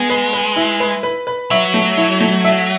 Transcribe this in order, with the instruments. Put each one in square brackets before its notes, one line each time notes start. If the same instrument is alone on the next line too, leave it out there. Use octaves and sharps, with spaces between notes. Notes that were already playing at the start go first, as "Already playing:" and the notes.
Already playing: [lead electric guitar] G#3 [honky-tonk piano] B3
[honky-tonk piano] B4
B4
E4
B4
B4
B4
[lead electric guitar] F#3 [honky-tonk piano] E5
[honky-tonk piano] A3
E4
A3
E5